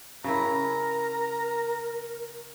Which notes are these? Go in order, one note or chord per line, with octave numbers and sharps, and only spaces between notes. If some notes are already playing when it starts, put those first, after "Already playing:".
C#3 E4 A#4 A#5